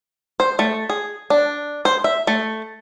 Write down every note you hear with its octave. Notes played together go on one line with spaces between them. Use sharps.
C5
A3
G#4
D4
C5
E5
A3